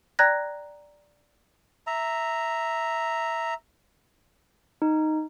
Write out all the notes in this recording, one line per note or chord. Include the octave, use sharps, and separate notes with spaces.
D5 G5 A#5 F#6 G#6 A#6
E5 A#5
D#4